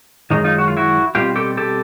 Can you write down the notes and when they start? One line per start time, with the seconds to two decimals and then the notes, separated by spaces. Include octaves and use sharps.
0.30 F#2 D#3 G#3 D#4
0.44 D#4 F4
0.58 F#4
0.68 F4
0.77 E4 F#4
1.15 B2 G3 C4 F4 G4
1.36 G4 A4
1.57 G4 A4